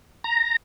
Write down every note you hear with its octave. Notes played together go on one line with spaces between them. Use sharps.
A#5